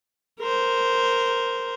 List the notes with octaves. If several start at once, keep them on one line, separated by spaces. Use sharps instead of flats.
A#4 C5